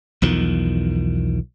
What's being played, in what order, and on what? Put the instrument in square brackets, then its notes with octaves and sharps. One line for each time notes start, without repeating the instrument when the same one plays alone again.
[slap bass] B1 E2 D#3 F3